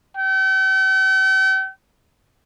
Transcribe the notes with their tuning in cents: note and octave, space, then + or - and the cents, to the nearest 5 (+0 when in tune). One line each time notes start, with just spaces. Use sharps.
G5 -45